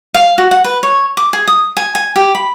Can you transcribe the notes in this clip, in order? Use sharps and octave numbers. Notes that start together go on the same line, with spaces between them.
F5
F#4
F#5
B4
C#5
D6
G#4
D#6
G#5
G#5
G4
B5